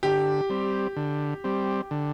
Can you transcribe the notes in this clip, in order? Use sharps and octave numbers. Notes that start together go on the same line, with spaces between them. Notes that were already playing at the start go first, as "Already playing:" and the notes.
D3 G4
G3 C4
D3
G3 C4
D3